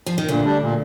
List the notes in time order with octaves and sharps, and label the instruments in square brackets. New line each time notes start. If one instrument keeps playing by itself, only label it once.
[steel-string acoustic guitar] F3
D#3
[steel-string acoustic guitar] D2 D3 [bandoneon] A#2
[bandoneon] G3 D4
A#2